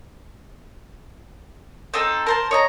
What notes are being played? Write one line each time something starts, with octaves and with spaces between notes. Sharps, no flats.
C4 D#4 A4
A#4 C5 A5
C#5 D#5 A#5